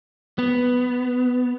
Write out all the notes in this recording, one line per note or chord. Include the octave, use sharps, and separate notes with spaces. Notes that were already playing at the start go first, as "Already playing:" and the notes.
B3